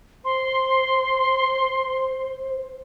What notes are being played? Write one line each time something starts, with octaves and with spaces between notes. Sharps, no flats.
C5 C6